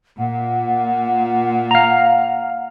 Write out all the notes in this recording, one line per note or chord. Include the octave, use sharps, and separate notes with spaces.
A#2 F#5
F5 A#5